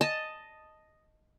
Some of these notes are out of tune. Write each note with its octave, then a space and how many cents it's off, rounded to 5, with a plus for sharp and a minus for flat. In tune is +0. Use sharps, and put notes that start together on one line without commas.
D#5 +0 A5 +5